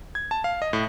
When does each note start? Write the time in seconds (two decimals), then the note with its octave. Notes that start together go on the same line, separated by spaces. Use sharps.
0.15 G#6
0.31 A5
0.44 F5
0.62 D#5
0.73 A2